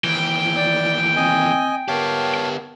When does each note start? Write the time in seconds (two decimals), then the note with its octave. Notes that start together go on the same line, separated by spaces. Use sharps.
0.04 D#2 E3 G5
0.56 D5
1.16 C4 D#5 G#5
1.88 B3 G4 A#4 C#5 F5 A5